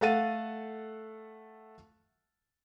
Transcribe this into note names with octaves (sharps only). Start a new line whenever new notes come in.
A3 A4 F5 F#5 A6 D#7